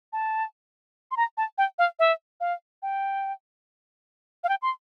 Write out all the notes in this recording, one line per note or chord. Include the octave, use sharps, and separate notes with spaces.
A5
C6
A#5
A5
G5
F5
E5
F5
G5
F5
G5
C6